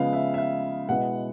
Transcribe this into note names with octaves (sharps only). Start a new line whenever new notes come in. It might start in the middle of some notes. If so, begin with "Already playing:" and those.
Already playing: C#3 F3 G#3 B3 F5
E5
E5
F5
B2 G#3 B3 E4 F#5